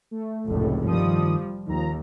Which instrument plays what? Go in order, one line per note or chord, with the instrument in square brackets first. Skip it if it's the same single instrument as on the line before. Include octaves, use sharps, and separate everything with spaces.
[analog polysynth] A3
[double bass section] F1 C#2 A2
[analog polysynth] G2 D#3 D#6 [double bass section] F3 G3
[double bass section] D#2 [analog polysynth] D#3 F3 A#5